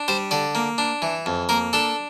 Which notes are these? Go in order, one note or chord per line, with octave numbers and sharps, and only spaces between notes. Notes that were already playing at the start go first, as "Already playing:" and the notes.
Already playing: D4
G3 C5
D3 D5
A#3
D4
E3
F2
A#3 A#4
D4 A4